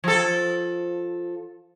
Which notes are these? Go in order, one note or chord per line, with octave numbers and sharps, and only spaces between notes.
F3 A4